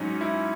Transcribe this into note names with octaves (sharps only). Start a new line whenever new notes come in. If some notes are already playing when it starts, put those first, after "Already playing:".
Already playing: G#2 F#3 C#4 D#4
E4